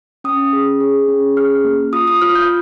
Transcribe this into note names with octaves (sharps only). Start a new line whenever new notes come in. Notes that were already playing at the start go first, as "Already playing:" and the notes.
C#4 D#6
G#4
G#4
C#4
G#4 F6
A#3
F4 D#6
D#6
F4 F6
G6